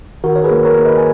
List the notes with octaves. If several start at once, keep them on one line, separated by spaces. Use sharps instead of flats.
D#3 F#4 A#4
C#5
G#4 B4
A#3
A#4 C#5
A#3
B4 D#5
G#5